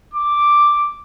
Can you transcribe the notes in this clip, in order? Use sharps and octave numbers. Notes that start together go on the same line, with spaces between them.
D6